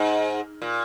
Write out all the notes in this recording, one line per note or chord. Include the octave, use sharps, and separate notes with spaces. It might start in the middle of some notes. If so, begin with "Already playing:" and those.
Already playing: G#2
A#2